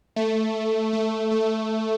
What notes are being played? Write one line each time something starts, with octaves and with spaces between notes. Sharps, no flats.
A3
A3
A3